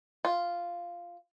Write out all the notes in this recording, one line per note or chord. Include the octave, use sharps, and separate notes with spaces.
F4